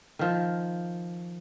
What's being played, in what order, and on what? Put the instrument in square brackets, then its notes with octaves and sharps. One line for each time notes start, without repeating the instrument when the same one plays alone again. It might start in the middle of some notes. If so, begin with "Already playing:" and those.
[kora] D#3 F3